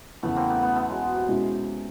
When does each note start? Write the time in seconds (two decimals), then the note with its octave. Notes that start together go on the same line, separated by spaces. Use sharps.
0.23 E2 C#3 E3 A3 B3
0.36 A#3 C4
0.49 A3 B3
0.62 A3 B3
0.76 A3 B3
0.88 F#3 G#3
1.15 C3
1.28 B2 G#3 C#4 E4